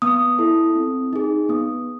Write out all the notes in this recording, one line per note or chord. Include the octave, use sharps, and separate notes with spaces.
B3 D#6
E4 A4
C4
D#4 G#4
B3 D#6